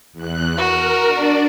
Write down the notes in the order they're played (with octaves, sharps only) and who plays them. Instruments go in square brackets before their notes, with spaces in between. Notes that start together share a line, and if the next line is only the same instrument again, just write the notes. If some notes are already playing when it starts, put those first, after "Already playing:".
[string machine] E2 F#6
[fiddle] F#4 [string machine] A#4
[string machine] D4 D5